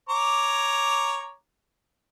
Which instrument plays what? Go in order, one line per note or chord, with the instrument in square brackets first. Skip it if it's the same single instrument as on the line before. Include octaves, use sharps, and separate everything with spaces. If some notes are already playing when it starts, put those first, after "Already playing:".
[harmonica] C#5 A#5 D6